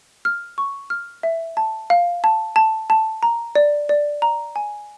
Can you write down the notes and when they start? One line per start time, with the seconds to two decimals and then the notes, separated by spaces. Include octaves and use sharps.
0.25 F6
0.58 C#6
0.90 F6
1.23 E5
1.57 A5
1.90 F5
2.24 A5
2.56 A5
2.90 A5
3.23 A#5
3.55 D5
3.89 D5
4.22 A#5
4.56 G#5